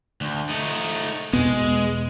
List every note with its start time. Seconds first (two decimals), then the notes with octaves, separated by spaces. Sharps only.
0.21 D2
0.49 A3 D#4
1.33 E2 B2 G#3 B3